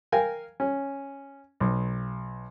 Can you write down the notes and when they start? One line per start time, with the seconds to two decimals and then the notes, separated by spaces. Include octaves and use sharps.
0.12 A#4 F5 G5 G#5
0.60 C#4
1.60 B1